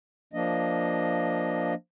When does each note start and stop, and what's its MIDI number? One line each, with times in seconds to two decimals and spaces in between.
0.33 1.74 53
0.33 1.74 58
0.33 1.74 62
0.33 1.74 75